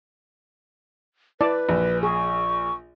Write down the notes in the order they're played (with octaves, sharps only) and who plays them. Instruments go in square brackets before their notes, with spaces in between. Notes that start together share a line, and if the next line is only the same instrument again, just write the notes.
[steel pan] E4 D5 A5 [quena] B4
[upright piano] A#1
[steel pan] G#4 [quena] C#6